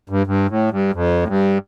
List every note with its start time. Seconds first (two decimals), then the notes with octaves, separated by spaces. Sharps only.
0.10 G2
0.27 G2
0.49 A2
0.71 G2
0.94 F2
1.23 A2
1.28 G2